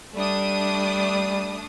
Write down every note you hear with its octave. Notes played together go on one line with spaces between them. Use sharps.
G3 A3 D4 D#6